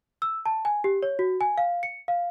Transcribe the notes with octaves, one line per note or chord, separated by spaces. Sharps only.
E6
A5
G#5
G4
C#5
F#4
G#5
F5
C#7
F5